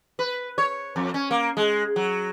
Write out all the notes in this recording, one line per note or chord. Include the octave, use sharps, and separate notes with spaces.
B4
C#5
F2
C#4
A#3
G#3
F#3